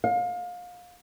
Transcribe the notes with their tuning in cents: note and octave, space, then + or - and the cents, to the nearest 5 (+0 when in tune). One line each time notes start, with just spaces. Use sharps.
F5 +30